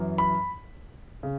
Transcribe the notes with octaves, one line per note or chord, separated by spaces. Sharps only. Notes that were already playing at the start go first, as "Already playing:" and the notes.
Already playing: F#2 E3
B5
C#3